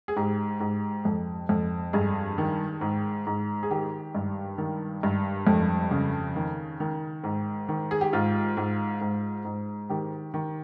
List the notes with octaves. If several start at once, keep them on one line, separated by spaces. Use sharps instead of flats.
G#4
G#2 G4
G#2
F2
F2
G2 G#4
D#3
G#2
G#2
G#4
D#3 G4
G2
D#3
G2
F2
C#3
D#3
D#3
G#2
D#3
G#4
G4
G#2 F4
G#2
G#2
G#2
D#3 G4
D#3